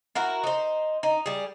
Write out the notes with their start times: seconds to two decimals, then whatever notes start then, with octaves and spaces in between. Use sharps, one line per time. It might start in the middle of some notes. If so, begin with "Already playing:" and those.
0.15 E4 F#4 A#4
0.44 D#4 C5
1.03 D#4
1.26 G3 G#4